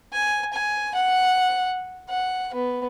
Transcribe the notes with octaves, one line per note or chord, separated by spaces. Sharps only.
G#5
G#5
F#5
F#5
B3